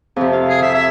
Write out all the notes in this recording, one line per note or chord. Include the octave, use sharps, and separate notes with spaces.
F2 C3
F5
G#4
C3 E5
E5